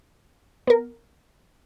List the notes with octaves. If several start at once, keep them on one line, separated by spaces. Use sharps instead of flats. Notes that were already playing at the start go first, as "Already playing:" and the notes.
B3 A#4